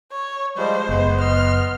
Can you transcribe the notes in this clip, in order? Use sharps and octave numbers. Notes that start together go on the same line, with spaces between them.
C#5
F3 G3 G#3 C5
F#1 G#3 B3
D#5 C6 F6